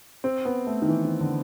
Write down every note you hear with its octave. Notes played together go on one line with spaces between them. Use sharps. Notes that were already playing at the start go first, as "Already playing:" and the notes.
C4
B3
A3
D#3
E3
D#3
D3